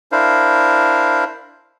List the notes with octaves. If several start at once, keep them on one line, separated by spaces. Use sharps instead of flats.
D4 E4 A#4 C5 F5